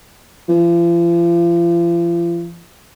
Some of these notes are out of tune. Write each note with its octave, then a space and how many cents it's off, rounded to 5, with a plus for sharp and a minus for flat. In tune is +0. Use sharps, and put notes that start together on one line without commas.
F3 -40